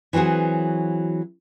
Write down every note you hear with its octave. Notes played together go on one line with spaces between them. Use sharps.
E3 F#3 C4 F#4 G#4